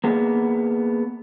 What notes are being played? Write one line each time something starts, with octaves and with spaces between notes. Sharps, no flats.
A#3 B3 G#4